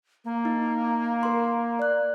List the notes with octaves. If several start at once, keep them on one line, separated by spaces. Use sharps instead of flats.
A#3
D#4
A#4 C6
D5 F#6